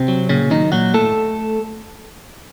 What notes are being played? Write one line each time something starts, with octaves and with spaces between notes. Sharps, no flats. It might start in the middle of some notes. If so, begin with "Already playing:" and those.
Already playing: C3 C4
F#3
A#2 C#3 C#4
D#3 F#3 D#4
A#2 F#3 F#4
A2 A3 A4